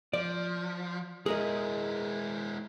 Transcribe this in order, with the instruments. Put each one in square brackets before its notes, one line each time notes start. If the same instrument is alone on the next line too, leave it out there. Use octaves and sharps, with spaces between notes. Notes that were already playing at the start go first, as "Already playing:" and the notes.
[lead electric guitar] F3 [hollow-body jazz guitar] D5
[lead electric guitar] G#3 E4 [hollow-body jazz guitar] G#4 A#4 D#5